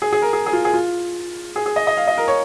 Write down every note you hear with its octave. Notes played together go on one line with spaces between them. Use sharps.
G#4
G#4
A#4
G#4
G#4
F4
G#4
F4
G#4
G#4
D#5
D#5
F5
D#5
A#4
C#5